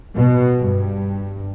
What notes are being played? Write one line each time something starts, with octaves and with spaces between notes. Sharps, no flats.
B2
G2